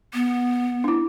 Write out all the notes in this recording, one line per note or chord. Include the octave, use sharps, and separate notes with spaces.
B3
D4 E4